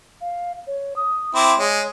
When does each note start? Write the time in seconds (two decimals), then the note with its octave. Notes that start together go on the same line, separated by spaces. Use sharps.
0.21 F5
0.67 C#5
0.96 D#6
1.35 C4 E4 D6
1.59 G#3 C#5